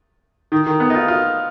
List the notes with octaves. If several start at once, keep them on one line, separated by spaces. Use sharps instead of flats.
D#3
D#3
B3
D#4
F4
F4